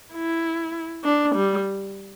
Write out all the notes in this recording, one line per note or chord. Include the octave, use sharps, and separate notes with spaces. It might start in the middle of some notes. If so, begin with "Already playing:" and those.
E4
D4
G3